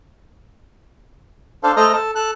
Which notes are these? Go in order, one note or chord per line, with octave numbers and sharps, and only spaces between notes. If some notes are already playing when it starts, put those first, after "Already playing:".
D4 A4 C5 F5
A3 A4 C5 D#5 A#5 F6
A4
A4 F#6